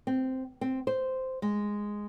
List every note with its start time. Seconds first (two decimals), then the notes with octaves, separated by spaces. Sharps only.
0.07 C4
0.61 C4
0.87 C5
1.42 G#3